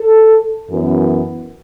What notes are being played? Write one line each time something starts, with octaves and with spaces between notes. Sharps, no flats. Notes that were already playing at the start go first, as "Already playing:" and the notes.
Already playing: A4
F#2 E3 B3